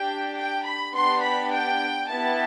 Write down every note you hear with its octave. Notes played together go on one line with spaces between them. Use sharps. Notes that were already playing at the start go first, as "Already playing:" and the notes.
Already playing: D4 G4 G5
G5
B5
B3 D4 G4 C6
B5
G5
B3 E4 G4 A5